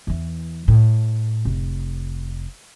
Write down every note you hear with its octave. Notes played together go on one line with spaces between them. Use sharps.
E2 E3
A2
F1